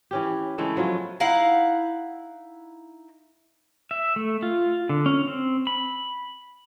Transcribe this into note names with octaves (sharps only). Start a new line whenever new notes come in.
E3 C#4 G4
C#3 E3 G#3 A3
F3 F#3 B3 F4
D#4 E4 F5 F#5
E5
A3
F4
D3
C#4
C4
B5